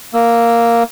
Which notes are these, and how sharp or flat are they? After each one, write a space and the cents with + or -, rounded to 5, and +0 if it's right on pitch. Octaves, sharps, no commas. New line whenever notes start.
A#3 +0 E6 +0